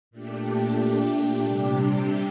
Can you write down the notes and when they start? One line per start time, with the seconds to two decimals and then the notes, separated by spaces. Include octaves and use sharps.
0.11 A#2 A3 D4 G4
1.42 C3 G3 D4 G4